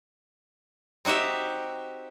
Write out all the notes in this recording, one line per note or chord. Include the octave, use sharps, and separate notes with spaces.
C4 D#4 F#4 G4 E5